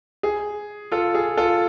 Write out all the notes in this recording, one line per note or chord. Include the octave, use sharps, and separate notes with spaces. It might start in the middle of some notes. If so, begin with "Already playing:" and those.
G#4
F4 A4
G#4
F4 A4